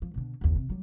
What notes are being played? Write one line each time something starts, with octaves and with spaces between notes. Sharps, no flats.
F3
B2 D3
F#1 D#2
C3
F#3 G3